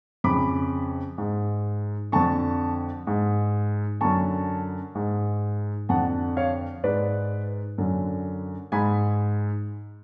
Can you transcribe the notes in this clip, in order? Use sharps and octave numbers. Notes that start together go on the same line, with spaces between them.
F2 C#3 B5 D6
G#2
F2 D3 A5 C#6
G#2
F#2 D3 A5 C#6
G#2
F2 D3 F#5 A5
C#5 F5
G#2 B4 D5
F#2 D3
G#2 G#5 B5